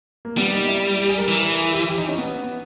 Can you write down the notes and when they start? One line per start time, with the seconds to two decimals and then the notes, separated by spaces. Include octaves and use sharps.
0.25 A#3
0.37 G3 B3
0.53 D#4
0.68 E4
0.98 G4
1.08 G#4
1.18 A#4
1.28 E3 A#4
1.58 G#4
1.73 G4
1.88 G4
1.98 D#4
2.08 C#4
2.18 B3